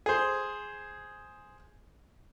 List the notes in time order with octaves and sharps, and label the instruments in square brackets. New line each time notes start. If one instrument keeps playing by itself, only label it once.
[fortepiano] G#4 C5